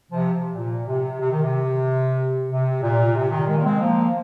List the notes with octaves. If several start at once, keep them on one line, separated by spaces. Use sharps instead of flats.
C3 F3
A#2
C3
C3
D#3
C3
C3
A#2
C3
A#2 D#3
D#3 G#3
A#3
G#3 C4
F3 A#3